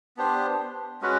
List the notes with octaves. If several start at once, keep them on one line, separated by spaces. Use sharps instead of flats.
B3 D4 G4 C5
G#3 C#4 F#4 B4